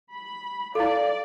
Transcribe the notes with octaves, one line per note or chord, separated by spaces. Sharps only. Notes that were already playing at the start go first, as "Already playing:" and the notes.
B5
E4 A4 D5 F5